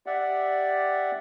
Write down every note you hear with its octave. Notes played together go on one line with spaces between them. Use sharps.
G4 D5 E5 F#5